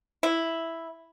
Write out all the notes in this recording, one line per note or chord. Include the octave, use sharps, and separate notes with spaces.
E4